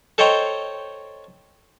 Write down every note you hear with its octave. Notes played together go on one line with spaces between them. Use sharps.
A4 C5 C#5 D#5 G5 A#5